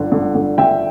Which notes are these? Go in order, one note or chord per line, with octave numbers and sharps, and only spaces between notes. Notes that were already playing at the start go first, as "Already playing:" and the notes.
Already playing: G1 D3
D3
D3
D3 E5 G5